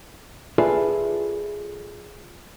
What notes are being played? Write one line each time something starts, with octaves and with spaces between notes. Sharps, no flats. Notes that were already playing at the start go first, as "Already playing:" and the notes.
F4 G#4 A4 B4 D5 E5